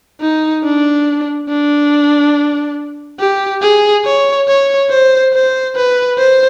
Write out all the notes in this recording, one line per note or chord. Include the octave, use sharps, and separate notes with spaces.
D#4
D4
D4
G4
G#4
C#5
C#5
C5
C5
B4
C5